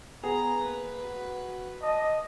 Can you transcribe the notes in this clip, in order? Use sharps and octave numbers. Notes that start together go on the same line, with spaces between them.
B3 G#4 A#5
A#3 B4
F#4
D#5 A5